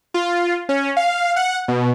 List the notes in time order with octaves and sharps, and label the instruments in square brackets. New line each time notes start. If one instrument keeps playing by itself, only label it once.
[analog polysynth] F4
C#4
F5
F#5
B2